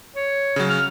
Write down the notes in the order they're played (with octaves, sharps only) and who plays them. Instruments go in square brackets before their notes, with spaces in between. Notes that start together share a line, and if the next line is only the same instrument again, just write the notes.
[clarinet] C#5
[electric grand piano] C#3 F#3
[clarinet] F6